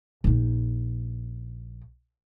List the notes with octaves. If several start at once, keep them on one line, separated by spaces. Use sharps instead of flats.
A#1 D#4